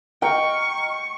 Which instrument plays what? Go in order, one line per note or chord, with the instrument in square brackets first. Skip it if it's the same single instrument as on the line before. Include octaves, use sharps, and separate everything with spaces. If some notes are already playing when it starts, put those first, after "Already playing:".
[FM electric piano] D#5 A#5 F6 [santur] G5 [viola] C#6